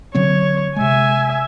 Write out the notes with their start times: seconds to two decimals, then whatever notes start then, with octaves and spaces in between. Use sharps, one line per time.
0.15 D3 F#3 C4 C#5
0.76 C3 G#3 E5 G#5